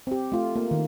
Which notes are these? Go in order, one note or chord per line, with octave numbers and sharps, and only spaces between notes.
C4 G4
A3 F4
A#3
D#3